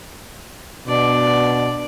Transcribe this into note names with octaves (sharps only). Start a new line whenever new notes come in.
B2 D4 D5